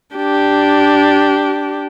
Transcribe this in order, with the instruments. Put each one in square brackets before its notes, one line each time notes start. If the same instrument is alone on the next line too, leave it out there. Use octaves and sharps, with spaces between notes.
[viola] D4 G4